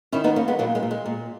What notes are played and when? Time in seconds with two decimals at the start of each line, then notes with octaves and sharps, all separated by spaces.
0.12 D#3 C#4 E4
0.24 B3 D#4
0.36 E2 A#3 C#4
0.48 G#3 B3
0.59 A#2 F#3 A#3
0.75 G#3
0.83 A#2
0.91 G#3
1.06 A#2